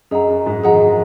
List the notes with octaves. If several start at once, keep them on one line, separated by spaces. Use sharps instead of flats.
F#2 G#4 D#5 F#5 A#5
F#2
G#2
F3 G#4 D#5 F#5 A#5
D#3
F3